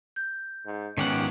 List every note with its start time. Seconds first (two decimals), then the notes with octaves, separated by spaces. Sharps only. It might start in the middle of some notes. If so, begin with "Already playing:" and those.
0.16 G6
0.66 G#2
0.98 G#2 D#3 B3 C#4 G4 F#5